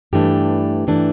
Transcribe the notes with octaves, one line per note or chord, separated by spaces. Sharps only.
G2 E3 A3 D4 G4
G2 E3 A3 D4